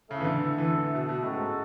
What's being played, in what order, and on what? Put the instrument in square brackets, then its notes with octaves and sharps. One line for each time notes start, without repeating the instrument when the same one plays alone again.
[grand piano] C#3 [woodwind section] A3 E4 A4 E5
[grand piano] E3
D3
E3
D3
B2
B2
[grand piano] A2 [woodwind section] G#3 C#4 F#4 A4
[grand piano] G#2